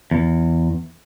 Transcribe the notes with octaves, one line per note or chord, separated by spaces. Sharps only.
E2